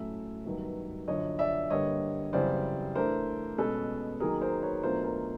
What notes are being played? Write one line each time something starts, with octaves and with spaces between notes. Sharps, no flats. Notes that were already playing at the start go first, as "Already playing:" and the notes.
Already playing: A2 F#3 A3 C#4 E4 E5
G2 D#3 F#3 B3
F#2 D3 F3 C#5 D#5
D5 E5
G2 D3 G3 A#3 C#5 D#5
F#2 C#3 E3 G3 C4 C5 D5
E3 A3 D4 A#4 C5
B2 G#3 C#4 A4 B4
D#3 F#3 A#3 G#4 A#4
A#4 C5
B4 C#5
B2 F#3 A3 D4 F4 A#4 C5
A#4 C5